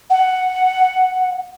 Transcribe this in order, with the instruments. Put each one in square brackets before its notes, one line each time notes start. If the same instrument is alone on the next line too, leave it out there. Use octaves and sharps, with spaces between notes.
[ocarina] F#5